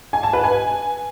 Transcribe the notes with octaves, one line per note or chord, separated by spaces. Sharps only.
G#5
A5
B4
G#5